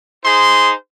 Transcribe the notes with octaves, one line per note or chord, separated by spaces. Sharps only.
D#4 G#4 C5 C6